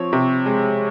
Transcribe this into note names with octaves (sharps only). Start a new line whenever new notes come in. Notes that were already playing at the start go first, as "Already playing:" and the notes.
Already playing: F3 C4 C#5
C3
G#3